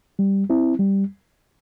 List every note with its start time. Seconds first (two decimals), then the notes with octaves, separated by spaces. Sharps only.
0.19 G3
0.50 C4 E4
0.79 G3